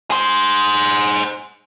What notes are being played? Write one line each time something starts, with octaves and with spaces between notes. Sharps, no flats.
G#4 C5